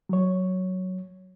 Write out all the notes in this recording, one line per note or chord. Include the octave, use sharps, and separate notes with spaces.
F#3 C#5